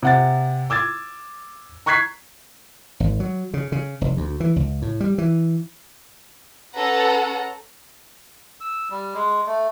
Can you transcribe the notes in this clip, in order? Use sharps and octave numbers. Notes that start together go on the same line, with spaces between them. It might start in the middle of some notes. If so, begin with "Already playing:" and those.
C3 F#5 A6
D6 E6 G#6 A6
A#5 C#6 F#6 G#6 B6 C7
G#1
F#3
C#3
C#3
F1
D2
E3
C#2
A2
G3
E3
C#4 A4 B4 F#5 A#5
E6
G3
G#3
A3